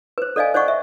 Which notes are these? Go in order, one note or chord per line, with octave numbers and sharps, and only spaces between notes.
B4 C5
A4 D5 D#5 F5 G#5
C5 D5 D#5 F#5 C#6
E5